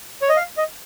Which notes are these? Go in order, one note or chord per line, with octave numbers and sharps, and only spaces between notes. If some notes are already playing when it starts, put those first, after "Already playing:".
C#5
D#5
F5
D#5